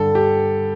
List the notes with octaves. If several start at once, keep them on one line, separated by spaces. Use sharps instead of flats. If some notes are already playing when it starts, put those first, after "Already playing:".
Already playing: G2 D3 A4
G4